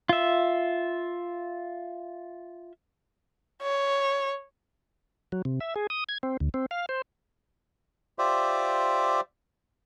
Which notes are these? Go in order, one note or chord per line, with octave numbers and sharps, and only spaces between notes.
F4 E5
C#5
F#3
C3
E5
G#4
D#6
G#6
C4
D2
C4
F5
C5
F4 G4 C5 D5 E5